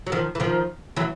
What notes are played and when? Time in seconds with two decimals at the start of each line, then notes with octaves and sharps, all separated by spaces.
0.07 F#3
0.12 D#3 F3
0.35 E3
0.40 D#3 F3
0.96 E3 F#3